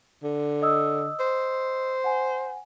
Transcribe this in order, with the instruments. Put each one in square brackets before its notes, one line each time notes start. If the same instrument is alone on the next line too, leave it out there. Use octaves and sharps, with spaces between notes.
[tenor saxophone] D3
[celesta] D#5 D#6 E6
[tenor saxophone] C5
[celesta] F#5 G#5